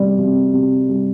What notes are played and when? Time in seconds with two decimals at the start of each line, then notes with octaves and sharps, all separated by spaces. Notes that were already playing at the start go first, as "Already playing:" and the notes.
Already playing: C3 G3
0.18 C3
0.53 C3
0.89 G3